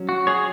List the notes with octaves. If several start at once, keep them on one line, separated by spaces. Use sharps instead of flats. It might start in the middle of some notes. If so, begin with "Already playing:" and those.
Already playing: F#3 C#4
F#4
G#4 C#5